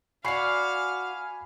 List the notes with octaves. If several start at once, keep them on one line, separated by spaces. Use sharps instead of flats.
F#4 D5 F5 G#5 B5 C7